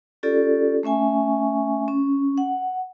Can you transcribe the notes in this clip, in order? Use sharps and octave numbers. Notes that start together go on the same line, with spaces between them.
C#4 F4 G4 A4 D5
A3 C#4 E5 G#5 C#6
C#4
F#5